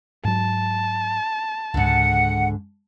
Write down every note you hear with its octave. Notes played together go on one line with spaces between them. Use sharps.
G#2 F#3 A5
C#2 G#2 D3 F#5